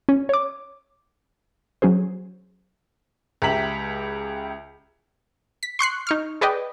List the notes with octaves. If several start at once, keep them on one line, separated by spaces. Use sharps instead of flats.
C#4
C#5 D6
F#3 C#4 G#4 C5
C#2 G4 E5 A#5 B6 F#7
B6
C6 C#6 F#6 C7
D#4 C#6 F6
G#4 B4 D5 D#5 G5